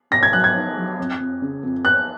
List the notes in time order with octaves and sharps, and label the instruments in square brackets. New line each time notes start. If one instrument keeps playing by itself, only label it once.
[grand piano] B2 [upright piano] A#6
[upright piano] G#6
[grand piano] F#3 [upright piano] F#6
[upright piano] G#6
[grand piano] D#4
F#3
F2
F2
C#3
F2
[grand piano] B3 [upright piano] F#6